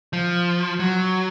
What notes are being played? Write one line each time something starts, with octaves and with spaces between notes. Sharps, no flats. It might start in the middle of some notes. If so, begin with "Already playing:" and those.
F3
F#3